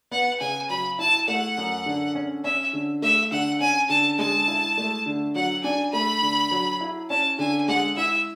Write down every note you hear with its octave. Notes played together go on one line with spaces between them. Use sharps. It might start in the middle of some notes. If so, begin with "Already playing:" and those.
B3 F#5
C#3 G#5
F#3 B5
E4 A5
A3 F#5
F#2
D3
C#4
C#4 E5
D3
A3 E5
D3 F#5
C#4 G#5
D3 A5
G#3 A5
E4
A3
D3
F#3 F#5
D4 G#5
A3 B5
D3
F#3
E4
C#4 A5
D3 G#5
G#3 F#5
E4 E5